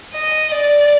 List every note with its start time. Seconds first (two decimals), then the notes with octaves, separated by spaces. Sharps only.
0.14 D#5
0.52 D5